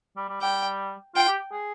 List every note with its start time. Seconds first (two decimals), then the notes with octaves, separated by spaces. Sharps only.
0.17 G3
0.29 G3
0.41 G3 G5
1.16 F4 G5
1.28 G4
1.52 G#4